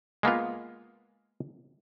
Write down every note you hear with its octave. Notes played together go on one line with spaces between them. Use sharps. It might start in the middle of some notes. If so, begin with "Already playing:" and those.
G#3 A#3 B3 F4